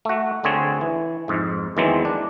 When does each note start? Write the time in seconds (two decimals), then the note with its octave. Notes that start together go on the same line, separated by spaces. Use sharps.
0.05 A3 F#4
0.44 D2 D3 C4 G#4 C#5
0.81 E3
1.28 F2 G#2
1.77 E2 D#3 E3 F#3 G#3 C4
2.05 D4